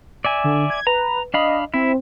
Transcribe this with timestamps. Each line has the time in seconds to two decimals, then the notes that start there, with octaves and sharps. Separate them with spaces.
0.25 D5 E5 G#5
0.44 D3
0.70 G#6
0.87 B4 A#5
1.34 D4 D#5 F5 B5
1.74 C4 E4